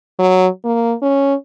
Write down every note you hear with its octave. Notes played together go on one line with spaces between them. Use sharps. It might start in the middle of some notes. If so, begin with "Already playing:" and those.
F#3
A#3
C#4